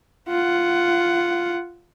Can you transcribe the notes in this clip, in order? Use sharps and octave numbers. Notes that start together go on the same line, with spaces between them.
F4 F#5